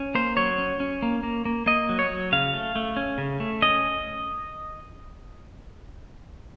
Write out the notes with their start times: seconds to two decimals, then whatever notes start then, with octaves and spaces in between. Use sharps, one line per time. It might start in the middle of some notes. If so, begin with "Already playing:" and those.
Already playing: C#4
0.15 A#3 C5
0.37 F#3 C#5
0.59 C#4
0.80 C#4
1.02 A#3
1.23 A#3
1.45 A#3
1.66 A#3 D#5
1.89 F#3
1.99 C#5
2.10 F#3
2.32 C#3 F5
2.54 A3
2.76 A3
2.96 C#4
3.18 C#3
3.40 A3
3.62 C#4 D#5